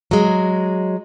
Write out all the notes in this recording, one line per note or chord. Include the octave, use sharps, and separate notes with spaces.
F#3 G#3